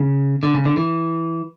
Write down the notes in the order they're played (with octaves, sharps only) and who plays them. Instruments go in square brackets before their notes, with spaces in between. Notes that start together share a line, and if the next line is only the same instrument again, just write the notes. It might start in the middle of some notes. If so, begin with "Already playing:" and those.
Already playing: [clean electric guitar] C#3
D3
C#3
D3
E3